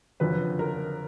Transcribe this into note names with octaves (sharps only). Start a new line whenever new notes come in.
F#1 F2 D3 F#3 B4
A#4